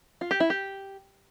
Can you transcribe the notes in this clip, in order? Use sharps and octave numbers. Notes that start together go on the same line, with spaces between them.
F4
G4
E4
G4